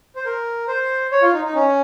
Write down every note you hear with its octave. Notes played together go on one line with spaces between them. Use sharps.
C5
A#4
C5
C#5
F4
D#4
D#4
C#4